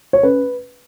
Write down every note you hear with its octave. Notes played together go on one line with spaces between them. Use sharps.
C#5
C#4 B4